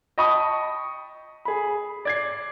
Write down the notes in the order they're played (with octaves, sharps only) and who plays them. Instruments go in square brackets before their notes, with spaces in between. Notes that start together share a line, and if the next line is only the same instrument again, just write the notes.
[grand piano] D#5 G5 A5 B5 C#6 D#6
G#4 B5
D5 G#6 C7